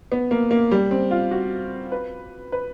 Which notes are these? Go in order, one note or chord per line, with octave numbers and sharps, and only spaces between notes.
B3
A#3
A#3
G3
C4
F4
F#4
B4
B4